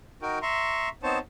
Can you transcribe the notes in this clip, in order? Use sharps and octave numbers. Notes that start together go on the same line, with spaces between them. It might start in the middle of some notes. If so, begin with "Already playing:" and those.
D#4 F#4 A#4 G5
E5 A#5 C6 C#6
B3 C4 D#4 C5 C#5 A5